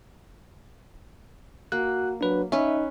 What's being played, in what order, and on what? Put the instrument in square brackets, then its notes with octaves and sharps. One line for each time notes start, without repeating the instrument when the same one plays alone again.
[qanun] A#3 [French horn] F#4 [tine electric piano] F#6
[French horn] F#3 [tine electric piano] D4 B4
[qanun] C#4 B4 [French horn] D#4 [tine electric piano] E5